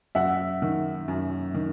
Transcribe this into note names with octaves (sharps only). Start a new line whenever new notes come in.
F#2 E5 F#5
D#3
F#2
D#3